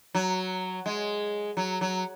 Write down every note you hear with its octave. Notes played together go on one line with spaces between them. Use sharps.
F#3
G#3
F#3
F#3